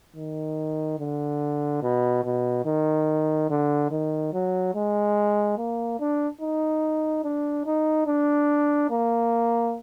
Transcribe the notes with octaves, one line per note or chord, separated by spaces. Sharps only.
D#3
D3
B2
B2
D#3
D3
D#3
F#3
G#3
A#3
D4
D#4
D4
D#4
D4
A#3